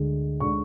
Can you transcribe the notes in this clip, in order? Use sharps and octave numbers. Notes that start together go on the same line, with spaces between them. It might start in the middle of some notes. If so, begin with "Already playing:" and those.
Already playing: D2 D3 G#3
D3 G#3 C#6